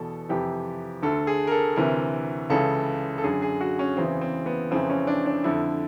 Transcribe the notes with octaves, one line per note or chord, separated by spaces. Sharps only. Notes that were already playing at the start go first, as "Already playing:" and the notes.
Already playing: E2 B2 A4
F2 C3 E3 G4
D2 D3 A4
G#4
A#4
A4
D2 C3 E3 A#4
C#2 C#3 E3 A4
A4
F#2 D3 G#4
G#4
F#4
C#4
E2 C#3 E3 C4
C4
B3
F2 C#3 E3 C4
C#4
D4
D4
F2 D3 E4